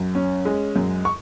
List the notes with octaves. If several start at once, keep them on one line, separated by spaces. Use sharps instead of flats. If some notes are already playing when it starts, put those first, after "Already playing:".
Already playing: F#2
C#4
G#3
F#2
C#6